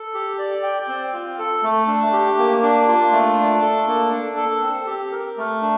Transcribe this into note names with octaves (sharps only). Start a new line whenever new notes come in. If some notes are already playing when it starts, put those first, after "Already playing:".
Already playing: A4
G4
D5
G5
C4
F4
A4
A3
D4
G4
A#3
D4
F4
A3
D4
A4
A#3
D4
A4
C4
G4
A#4
A3
D4